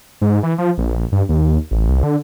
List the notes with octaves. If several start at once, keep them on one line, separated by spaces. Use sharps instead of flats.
G#2
E3
F3
A#1
G2
D#2
A1
C2
D3